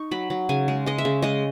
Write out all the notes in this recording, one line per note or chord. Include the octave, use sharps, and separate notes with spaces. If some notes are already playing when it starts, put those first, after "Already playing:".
Already playing: D#4 C#6
F#3 B5
F#3
C#3 G#5
G#3
G#3 D#5
E5
C#3
G#3 D#5